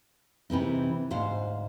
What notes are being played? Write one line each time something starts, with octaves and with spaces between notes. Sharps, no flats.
C3 E3 C4 D#4
D2 G#2 C5 F5